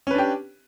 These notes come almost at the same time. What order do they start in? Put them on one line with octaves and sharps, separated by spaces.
C#4 B4 D4 G4